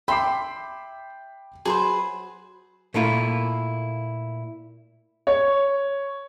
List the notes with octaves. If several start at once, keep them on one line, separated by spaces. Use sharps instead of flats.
E5 G5 B5 C6 D6 B6 C7
F#3 G#4 B4 C5
A#2 A3 A#3 E4 F4
C#5